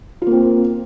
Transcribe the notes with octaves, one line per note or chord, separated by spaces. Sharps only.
A#3 C4 F4